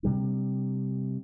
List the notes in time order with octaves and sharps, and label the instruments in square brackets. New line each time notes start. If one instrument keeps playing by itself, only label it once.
[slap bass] C3 G3 D4